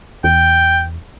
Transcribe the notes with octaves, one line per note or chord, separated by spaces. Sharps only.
E2 G5